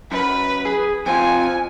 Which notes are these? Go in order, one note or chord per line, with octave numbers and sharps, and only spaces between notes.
F#2 B4
G#4
F2 C4 F4 G#5